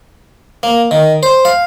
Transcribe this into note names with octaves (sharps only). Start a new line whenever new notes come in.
A#3
D#3
C5
F5